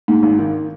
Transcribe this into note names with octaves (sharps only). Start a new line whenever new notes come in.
G#2
G#1
D#3